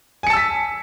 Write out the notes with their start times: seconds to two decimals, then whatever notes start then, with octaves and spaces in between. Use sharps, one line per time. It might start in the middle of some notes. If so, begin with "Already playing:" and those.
0.23 G#5
0.27 C#7
0.30 A5
0.33 E6
0.37 B6